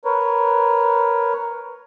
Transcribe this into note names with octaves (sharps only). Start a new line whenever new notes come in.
A#4 B4 C#5